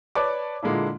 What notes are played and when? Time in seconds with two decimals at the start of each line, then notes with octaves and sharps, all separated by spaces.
0.15 B4 C#5 D5 A5 D6
0.63 A#2 D3 G#3 A#3 D4 E4